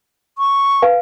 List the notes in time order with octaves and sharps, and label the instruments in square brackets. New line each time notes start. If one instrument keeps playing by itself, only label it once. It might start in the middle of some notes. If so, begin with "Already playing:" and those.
[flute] C#6
[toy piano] B4 F5 G#5